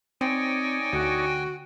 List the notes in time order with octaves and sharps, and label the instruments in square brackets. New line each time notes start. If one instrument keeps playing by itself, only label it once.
[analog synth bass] C4 [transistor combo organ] D#4 C#5 D5 [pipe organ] G5 G#5
[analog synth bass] D2 [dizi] F#4